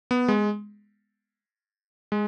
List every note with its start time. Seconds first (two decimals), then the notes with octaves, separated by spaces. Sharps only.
0.11 B3
0.28 G#3
2.12 G#3